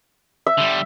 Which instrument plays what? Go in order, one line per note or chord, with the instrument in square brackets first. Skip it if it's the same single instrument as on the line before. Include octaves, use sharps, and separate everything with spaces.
[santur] E5
[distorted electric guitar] D3 G3